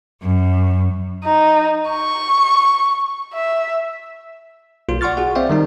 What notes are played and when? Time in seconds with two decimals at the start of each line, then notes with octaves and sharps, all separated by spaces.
0.23 F#2
1.24 D#4
1.90 C#6
3.34 E5
4.89 B1 A#3 F4
5.01 D5 F#5 C6 C#6 F6 A6
5.17 F4 F#4 G#4 F#5
5.35 C4 C5 D5 E5 F5 G5
5.50 D#3 G3 D#4